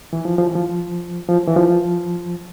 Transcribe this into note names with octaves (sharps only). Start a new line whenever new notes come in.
E3
F3
F3
E3
F3
F3
E3
F3